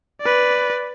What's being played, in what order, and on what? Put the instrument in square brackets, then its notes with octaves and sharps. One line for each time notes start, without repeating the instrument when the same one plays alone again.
[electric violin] B4 D5